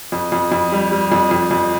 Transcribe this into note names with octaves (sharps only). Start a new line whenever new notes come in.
F2
F2
F2
G3
G3
F2
F2
F2